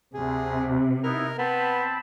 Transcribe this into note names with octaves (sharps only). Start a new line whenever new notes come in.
D2 C3 G#4
B3 D#4 E4 A#4
B3 C4 A5 B5